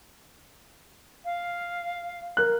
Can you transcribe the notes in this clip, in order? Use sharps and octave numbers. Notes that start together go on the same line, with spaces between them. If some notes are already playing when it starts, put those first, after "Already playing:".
F5
A#4 F#6